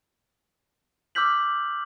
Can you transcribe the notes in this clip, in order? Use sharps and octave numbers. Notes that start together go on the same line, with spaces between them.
D6 E6 F6 G6 B6 F#7